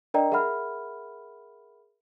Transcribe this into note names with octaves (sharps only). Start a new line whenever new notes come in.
D4 A#4 D5 D#5 G5 A#5
G#4 A#4 E5 F#5 B5 F6